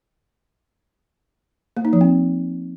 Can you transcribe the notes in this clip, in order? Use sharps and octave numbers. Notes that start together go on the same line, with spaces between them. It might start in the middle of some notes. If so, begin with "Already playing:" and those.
A#3
D#4
F3
C4